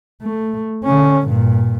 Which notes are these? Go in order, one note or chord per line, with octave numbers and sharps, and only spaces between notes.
A3
D3 C#4
G2 A#2